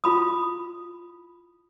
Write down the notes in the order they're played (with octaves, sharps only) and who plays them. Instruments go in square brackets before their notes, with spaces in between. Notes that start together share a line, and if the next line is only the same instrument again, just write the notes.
[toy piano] E4 F4 B5 D#6